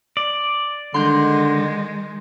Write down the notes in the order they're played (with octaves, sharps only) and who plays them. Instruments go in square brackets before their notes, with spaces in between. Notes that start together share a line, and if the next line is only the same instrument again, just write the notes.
[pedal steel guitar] D5
[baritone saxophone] D3 [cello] D#3 G#3 [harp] C6 G6